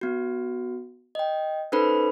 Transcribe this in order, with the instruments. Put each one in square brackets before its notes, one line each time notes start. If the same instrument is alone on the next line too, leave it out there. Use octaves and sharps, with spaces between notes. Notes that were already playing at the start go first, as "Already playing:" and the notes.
[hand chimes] B3 F#4
D#5 G5
C#4 D#4 A4 B4 C5 B5